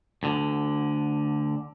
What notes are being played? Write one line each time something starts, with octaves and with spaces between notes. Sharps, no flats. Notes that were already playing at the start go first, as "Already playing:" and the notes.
D2 D3